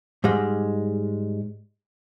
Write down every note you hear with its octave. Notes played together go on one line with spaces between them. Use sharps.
G#2 G3 G#3